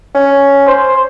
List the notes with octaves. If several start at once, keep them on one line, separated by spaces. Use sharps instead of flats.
C#4
C5